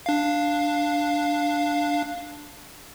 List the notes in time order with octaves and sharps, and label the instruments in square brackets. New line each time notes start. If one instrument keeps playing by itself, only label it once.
[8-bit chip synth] D4 F5